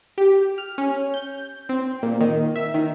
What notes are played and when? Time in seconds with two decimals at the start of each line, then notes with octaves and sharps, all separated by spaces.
0.18 G4
0.58 F6
0.78 C#4
1.14 G6
1.69 C4
2.03 A#2
2.21 D#3
2.56 E5
2.74 D#3